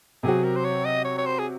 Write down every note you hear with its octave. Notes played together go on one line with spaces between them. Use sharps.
C3 F#3 C4 F#4 G#4
A#4
C5
C#5
D#5
C#5
C#5
C5
G#4